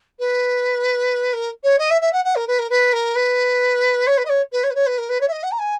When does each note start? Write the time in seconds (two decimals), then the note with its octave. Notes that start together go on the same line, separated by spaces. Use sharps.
0.19 B4
1.33 A#4
1.63 C#5
1.78 D#5
1.90 E5
2.01 E5
2.12 F#5
2.24 F#5
2.35 A#4
2.47 B4
2.58 A#4
2.69 B4
2.92 A#4
3.15 B4
4.06 C#5
4.17 B4
4.25 D#5
4.29 C#5
4.52 B4
4.63 C#5
4.70 B4
4.74 C#5
4.86 B4
4.97 A#4
5.09 B4
5.20 C#5
5.27 E5
5.32 D#5
5.43 F#5
5.51 A#5
5.58 G#5